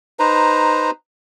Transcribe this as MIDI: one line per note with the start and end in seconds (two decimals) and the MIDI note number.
0.19 0.91 63
0.19 0.91 71
0.19 0.91 72
0.19 0.91 82